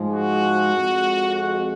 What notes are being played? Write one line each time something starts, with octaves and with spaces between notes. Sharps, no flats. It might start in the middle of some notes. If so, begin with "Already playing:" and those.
Already playing: G#2 F3 G#3
F#4
F2 F3 G#3
F#4